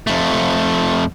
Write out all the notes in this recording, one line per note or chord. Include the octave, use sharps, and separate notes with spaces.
F2 A3